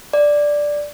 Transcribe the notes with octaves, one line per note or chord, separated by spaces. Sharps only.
D5